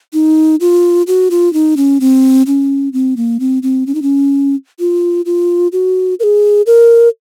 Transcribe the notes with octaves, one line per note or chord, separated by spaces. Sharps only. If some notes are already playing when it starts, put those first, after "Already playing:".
D#4
F4
F#4
F4
D#4
C#4
C4
C#4
C4
A#3
C4
C4
C#4
D#4
C#4
F4
F4
F#4
A#4
G#4
A#4